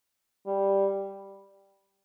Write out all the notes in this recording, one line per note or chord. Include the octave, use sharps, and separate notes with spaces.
G3